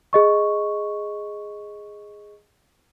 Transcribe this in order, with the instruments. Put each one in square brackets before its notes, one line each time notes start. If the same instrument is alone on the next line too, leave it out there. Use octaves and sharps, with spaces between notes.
[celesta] G#4 D#5 C#6